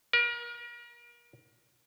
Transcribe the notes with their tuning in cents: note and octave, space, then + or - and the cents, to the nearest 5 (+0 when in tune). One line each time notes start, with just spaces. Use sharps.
A#4 +35